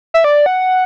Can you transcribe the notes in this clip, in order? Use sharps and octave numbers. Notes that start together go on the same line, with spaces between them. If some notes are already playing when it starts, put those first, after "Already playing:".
E5
D5
F#5